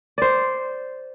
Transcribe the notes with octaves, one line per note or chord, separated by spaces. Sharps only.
C5 D5